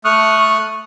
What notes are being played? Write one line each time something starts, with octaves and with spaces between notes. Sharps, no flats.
A3 C#6 D#6 F6 F#6